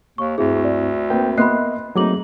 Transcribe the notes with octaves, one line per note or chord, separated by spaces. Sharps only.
D#2 C#6
D2 G2 C4 E4 G#4
D5
A#3 C4 B4 G5
A#3 B3 D#5 E5 B5 C6 F#6 C7
F#3 A3 A#3 C4 D#4 G#4 D6 F#7